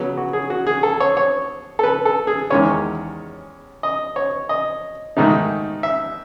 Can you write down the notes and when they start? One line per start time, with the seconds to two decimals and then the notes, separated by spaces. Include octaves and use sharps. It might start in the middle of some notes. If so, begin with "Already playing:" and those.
Already playing: C#3 F#3 B3
0.17 F#4
0.33 G#4
0.50 F#4
0.67 G#4
0.83 A4
1.00 C#5
1.17 C#5
1.79 A4
1.83 B4
2.05 A4
2.27 G#4
2.50 E2 D#3 G#3 C#4 C#5
3.83 D#5
4.16 C#5
4.49 D#5
5.17 G#2 D#3 A3 D#4
5.83 E5